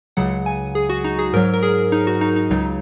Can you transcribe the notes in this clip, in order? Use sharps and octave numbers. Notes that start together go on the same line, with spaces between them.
C#2 C#3 F#3 F#5
G#5
G#4
F#4
D#4
G#4
G#2 F#3 A#4
A#4
G#4
D#4
F#4
D#4
D#4
C#2 C#3 F#3 D#4